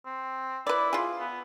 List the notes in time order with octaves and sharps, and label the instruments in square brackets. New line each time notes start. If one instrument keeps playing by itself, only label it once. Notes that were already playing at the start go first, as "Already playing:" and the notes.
[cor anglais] C4
[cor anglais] E4 [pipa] B4 D5
[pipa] F4 G#4
[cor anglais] B3